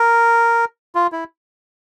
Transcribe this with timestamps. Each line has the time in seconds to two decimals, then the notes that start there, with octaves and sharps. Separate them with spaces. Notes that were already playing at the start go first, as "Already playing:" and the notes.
Already playing: A#4
0.95 F4
1.12 E4